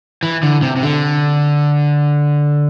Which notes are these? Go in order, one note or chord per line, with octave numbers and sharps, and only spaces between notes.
E3
D3
C3
C3
D3